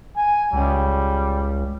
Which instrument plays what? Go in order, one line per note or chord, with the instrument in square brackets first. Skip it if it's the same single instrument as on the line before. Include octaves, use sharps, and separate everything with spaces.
[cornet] G#5
[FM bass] C#2 [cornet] G3